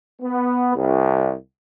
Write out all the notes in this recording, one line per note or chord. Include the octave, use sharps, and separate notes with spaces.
B3
C2